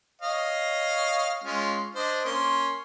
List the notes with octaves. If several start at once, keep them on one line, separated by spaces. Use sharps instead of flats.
C#5 D#5 F5
G#3 C#4 F4
D4 C5 D#5
A#3 C#4 C6